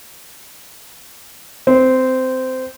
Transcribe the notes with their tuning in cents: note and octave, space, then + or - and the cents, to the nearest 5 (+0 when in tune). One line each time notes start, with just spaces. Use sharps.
C4 -15